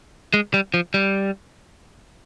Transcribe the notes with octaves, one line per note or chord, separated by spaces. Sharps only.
G#3
G3
F3
G3